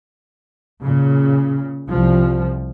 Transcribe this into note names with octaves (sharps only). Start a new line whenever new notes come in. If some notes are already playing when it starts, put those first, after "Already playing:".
A#2 C#3
C2 F3